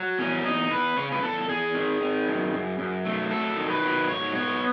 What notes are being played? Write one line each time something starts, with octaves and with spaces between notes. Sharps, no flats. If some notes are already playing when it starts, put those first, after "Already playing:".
Already playing: F#3
E2 C#4
E2 D#4
E2 B4
C#3 C#5
B4
E2 A4
E2 G#4
D#3
D#3
F#2
F#2
F#2
A3
F#3 A4
D#3
B4
F#3
G#2 C#5
B3 C#5